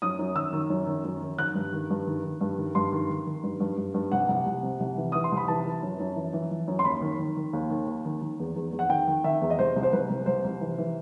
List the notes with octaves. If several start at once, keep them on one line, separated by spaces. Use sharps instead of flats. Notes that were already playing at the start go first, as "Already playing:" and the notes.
F#2 D#6
F#2
D#3 E6
D#3
F#2
D#3
F#2
D#3
D#3 F#6
G2
D#3
G2
D#3
D#3
G2
D#3
G2 C6
D#3
D#3
D#3
G2
G2
G2
G2
C2 F#5
C2
C2
C3
C2
E3
E3 D#6
C6
C2
B5
E3 A5
E3
F#2
F#2
E3
E3
E3
F#2
C6
D#2 B5
D#3
D#3
D#3
D#2
D#3
D#2
D#3
D#3
E2
E2
E2
F#5
D#3 G5
D#3
D#3 E5
E2
D#5
C2 C5
C2
C5
C2 B4
C2
C2 C5
C2
E3
E3